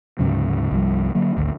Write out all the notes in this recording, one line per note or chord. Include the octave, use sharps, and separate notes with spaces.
D2 G#2 C#3 F#3
C2 G2 F3 G3
D3 F#3 A#3
G#1 D2